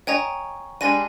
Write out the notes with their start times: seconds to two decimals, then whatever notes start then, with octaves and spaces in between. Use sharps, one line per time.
0.07 C#5 D#5 G5 G#5 A#5
0.81 G3 G#3 D4 G#5 A#6 D#7